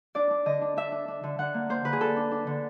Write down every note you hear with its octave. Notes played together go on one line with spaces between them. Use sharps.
D4 D5
D4
D3 D#5
D4
D4 E5
D4
D4
D3
D3 F#5
A#3
A#3 C5
D3 B4
G#4
D3 A4
D4
D4
D3